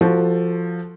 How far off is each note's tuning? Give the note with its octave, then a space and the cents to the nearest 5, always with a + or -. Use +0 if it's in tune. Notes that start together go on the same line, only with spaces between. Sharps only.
F3 +0 F#4 +5 A4 +15